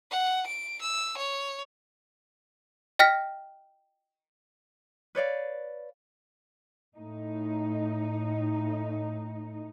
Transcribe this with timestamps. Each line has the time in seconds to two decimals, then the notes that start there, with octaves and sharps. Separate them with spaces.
0.10 F#5
0.46 D7
0.81 E6
1.17 C#5
2.99 D#5 G5 F6 A#6 B6
5.15 B4 C#5 D5 F5
6.98 A2 D#4